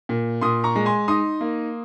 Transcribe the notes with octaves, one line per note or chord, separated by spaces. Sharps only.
A#2
A#2 C6 D#6
A#5 C#6
G#3
G#5 C6
D#4 C6 D#6
A#3